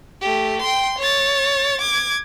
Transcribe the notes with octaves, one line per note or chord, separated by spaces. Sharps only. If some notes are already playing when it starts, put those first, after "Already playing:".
A3 G4
G5 C6
C#5 A6
D6 G#6